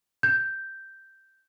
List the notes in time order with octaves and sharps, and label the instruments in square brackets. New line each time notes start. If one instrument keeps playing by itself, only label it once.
[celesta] G6